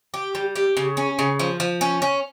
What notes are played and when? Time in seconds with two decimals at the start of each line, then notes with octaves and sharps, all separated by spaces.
0.14 G4
0.35 G3
0.56 G4
0.77 C#3
0.97 C#4
1.19 C#3
1.40 F3
1.60 F3
1.81 C#4
2.02 C#4